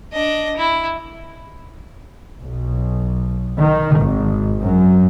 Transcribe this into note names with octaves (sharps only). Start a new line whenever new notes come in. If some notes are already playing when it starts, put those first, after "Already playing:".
D4 D#5
E4
B1
D#3
G#1
F#2